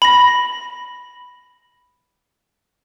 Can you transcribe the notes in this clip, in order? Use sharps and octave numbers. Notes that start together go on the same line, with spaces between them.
B5 A#6